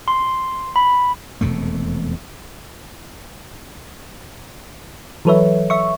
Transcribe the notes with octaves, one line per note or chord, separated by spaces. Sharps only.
C6
B5
E1 F2 C3 A3
E3 F#3 A4 B4 C#5 E5
E5 C#6